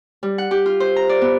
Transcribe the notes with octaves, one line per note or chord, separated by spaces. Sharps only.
G3
F#5
G4
F4
C5
A#5
D5
B3